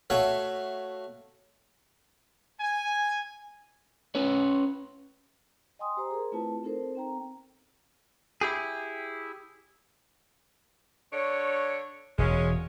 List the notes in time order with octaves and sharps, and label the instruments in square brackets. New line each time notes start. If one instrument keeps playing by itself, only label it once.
[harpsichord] A3 F#4 C#5 E5 F5
[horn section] G#5
[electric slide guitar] C#4 B4 C#5
[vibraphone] D#5 G5 G#5 C6 D#6
G4 C5 A#5
G#4 A#4
A3 C4 E4 F4 B4 A5
C4 D#4 A4 A#4 C5
C4 G5 A#5
[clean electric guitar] E4 G4 G#4
[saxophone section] D3 D4 C#5
[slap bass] E1 [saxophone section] G#3 C#4